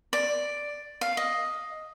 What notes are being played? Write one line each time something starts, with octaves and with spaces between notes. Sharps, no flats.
D5
F5
D#5